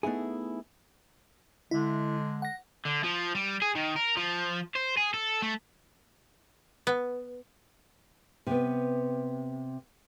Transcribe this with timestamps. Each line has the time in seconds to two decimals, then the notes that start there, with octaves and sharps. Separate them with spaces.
0.03 A3 B3 D#4 E4 G#4
1.71 D3 G#3 E4
2.42 F#5 A#6
2.85 D3
3.04 F3
3.35 G3
3.62 G#4
3.75 D#3
3.96 A#4
4.17 F3
4.75 C5
4.97 G#4
5.14 A4
5.42 A3
6.87 B3
8.47 C3 B3